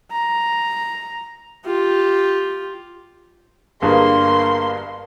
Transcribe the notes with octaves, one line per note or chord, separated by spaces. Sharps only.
A#5
F4 G4
G1 G2 A#3 G#4 C6